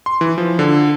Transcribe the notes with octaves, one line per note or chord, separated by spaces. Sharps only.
C6
E3
F3
D3